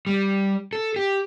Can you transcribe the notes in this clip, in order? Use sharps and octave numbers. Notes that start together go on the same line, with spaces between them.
G3
A4
G4